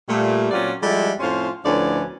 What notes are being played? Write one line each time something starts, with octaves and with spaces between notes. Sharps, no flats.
A#2 G3 A3
A#2 F#3 C4 C#4 F4 D5
F3 G3 G#3 E4 F#4 A4
F2 A2 C#4 F4 C5
D2 A2 F3 B3 C#4 D5